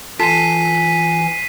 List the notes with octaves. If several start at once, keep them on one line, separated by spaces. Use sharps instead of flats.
E3 F4 A4 G#5 B6 C7 D#7